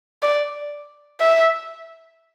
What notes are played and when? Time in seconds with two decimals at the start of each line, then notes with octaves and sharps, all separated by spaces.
0.22 D5
1.21 E5